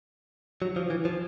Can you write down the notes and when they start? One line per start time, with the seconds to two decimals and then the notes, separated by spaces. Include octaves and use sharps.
0.62 F#3
0.76 F3
0.90 E3
1.05 F3